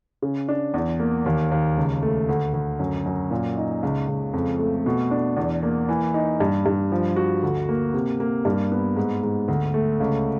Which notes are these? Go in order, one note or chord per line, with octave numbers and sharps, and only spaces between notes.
C#3
D4
E2
A#3
D#2
D#2
C#2
A3
D2
D2
F#2
F#2
A#2
D#4
C#2
C#2
F2
A3
B2
D4
E2
A#3
E3
D#4
G2
G2
F3
F#4
D2
A#3
C3
A#3
G2
B3
G#2
G#2
D2
A3
C#2